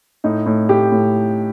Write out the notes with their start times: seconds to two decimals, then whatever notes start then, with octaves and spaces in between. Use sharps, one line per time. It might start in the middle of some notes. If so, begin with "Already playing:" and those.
0.24 A2 D#4
0.46 A2
0.69 A2 G4
0.92 A2